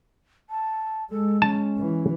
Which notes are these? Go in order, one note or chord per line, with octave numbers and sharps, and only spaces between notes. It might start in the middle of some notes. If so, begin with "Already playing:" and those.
A5
G#3 A4
C#4 A5
E3